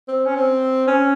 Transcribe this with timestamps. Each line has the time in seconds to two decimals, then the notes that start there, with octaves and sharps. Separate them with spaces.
0.08 C4
0.25 C#4
0.35 C4
0.87 C#4